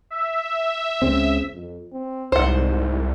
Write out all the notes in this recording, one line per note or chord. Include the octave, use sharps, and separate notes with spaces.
E5
C#2 C#3 C4
F2
C4
C2 G#2 C5 F#5